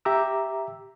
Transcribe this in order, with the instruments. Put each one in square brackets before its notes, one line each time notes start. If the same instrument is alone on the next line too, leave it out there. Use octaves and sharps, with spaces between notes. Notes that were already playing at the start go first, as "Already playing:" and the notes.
[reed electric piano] G4 E5 A#5 D6 E6